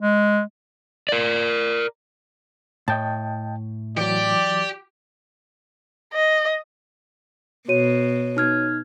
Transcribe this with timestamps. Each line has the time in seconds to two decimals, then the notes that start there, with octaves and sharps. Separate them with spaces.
0.01 G#3
1.09 A#4 D5
2.88 A2 D#5 G5 A5
3.97 E3 F#3 G4 D5
6.13 D#5
7.68 B2 F#4 C#5 D#7
8.37 D#4 F6 G#6